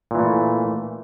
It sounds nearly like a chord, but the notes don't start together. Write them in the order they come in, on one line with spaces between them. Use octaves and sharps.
A#2 E3 A3